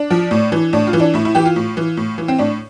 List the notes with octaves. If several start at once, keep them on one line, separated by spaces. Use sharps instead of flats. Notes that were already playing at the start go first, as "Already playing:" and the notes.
Already playing: D4
F3
A2
E3
A2 D4
F4
E3
D4
A2 E4
E4
E3 G4
F4
A2
E3
A2
E3
C4
A2 D4